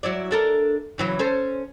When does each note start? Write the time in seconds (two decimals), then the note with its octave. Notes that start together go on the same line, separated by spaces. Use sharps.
0.03 F#3 E4 D5
0.31 D4 A4 A#4
0.98 C#3 E3 F#3
1.19 C#4 A4 C5